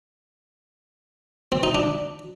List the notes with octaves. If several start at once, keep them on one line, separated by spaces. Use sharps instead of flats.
C4
D#4
D4